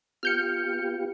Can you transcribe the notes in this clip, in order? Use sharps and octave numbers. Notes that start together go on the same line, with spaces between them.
B3 F4 G4 F6 G6 C#7